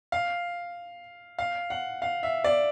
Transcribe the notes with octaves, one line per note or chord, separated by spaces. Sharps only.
F5
F5
F#5
F5
E5
D5